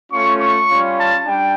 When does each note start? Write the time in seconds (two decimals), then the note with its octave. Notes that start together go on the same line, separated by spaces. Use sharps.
0.11 A3 C#4 F4 C#6
0.40 C#6
0.69 G3 C#4 F4
0.98 A5
1.26 G3 D4 G5